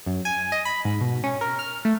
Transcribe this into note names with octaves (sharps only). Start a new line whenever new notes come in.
F#2
G#5
D#5
B5
G#2
B2
C#4
A#4
F6
A3